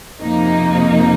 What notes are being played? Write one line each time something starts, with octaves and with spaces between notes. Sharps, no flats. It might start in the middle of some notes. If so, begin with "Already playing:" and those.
F2 C3 F3 A#3 D#4